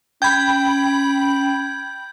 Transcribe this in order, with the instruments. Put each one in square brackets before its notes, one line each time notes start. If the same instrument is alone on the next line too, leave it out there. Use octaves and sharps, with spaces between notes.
[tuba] C#4 [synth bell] G5 B5 [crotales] G6 G#6